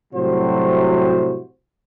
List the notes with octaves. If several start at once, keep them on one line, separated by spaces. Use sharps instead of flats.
A2 C3 F#3 G3 F#4 C5